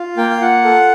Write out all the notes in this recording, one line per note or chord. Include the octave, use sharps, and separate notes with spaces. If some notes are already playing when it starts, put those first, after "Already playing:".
Already playing: F4
A#3 G5
F5
F4 F#5
A4